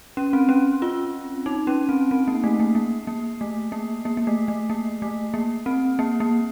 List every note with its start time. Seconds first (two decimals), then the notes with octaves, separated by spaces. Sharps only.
0.17 C#4
0.33 C4
0.49 C#4
0.82 F4
1.46 D#4
1.67 C#4
1.89 C4
2.11 C4
2.28 A#3
2.44 A3
2.60 A#3
2.75 A#3
3.07 A#3
3.41 A3
3.72 A#3
4.05 A#3
4.17 A#3
4.27 A3
4.48 A3
4.70 A#3
5.02 A3
5.34 A#3
5.66 C4
5.99 A#3
6.20 A#3